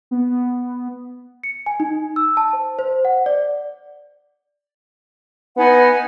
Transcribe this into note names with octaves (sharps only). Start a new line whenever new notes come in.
B3
C#7
G#5
D#4
E6
A5
C5
C5
F#5
D5
B3 D#4 F#5 G#5